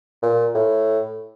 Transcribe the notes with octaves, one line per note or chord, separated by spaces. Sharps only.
A#2
A2